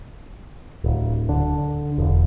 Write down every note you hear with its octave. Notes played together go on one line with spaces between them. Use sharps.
D1
D3
E1